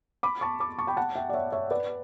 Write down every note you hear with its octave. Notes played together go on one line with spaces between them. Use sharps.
B5 D6
A5 C#6
B5 D6
A5 C#6
G5 B5
F#5 A5
E5 G5
D5
C#5 E5
C#5 E5
B4 D5